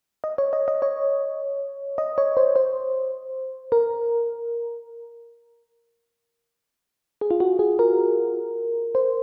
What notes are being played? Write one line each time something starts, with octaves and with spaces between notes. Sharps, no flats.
D#5
C#5
D#5
D#5
C#5
D#5
C#5
C5
C5
A#4
G#4
F4
F#4
G#4
A#4
C5